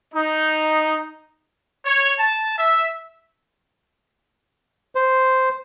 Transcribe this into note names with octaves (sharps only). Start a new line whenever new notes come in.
D#4
C#5
A5
E5
C5